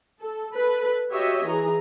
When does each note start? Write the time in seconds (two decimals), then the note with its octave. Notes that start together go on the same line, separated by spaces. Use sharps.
0.20 A4
0.55 A4 B4
1.10 F#4 G4 C#5 D#5 E5
1.45 E3 G#4 A#5